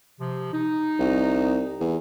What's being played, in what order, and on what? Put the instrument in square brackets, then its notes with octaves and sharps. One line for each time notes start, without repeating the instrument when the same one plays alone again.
[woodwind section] C3 F3
D#4
[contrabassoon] C2
E2